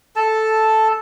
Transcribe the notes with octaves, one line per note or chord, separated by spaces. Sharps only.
A4 A5